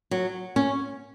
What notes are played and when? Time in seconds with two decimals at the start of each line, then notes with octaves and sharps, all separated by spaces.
0.11 F#3
0.56 C#4